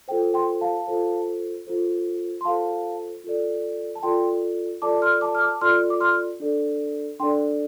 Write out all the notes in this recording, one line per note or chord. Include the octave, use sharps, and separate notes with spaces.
F4 A4 C5 G5
G5 C6
F5 A5
F4 A4 C5
F4 A4 C5
C6
F4 A4 C5 F5 A5
F4 A4 D5
A5
F4 A4 D5 G5 C6
F4 A4 D5 A5 D6
C6 F6
A5 D6
F6
A5 D6
F4 A4 D5 C6 F6
D6
C6 F6
D4 A4 D5
D4 A4 D5 G5 C6